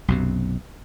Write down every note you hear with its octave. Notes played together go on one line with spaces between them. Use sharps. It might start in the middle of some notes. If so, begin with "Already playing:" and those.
B1 F#2 C3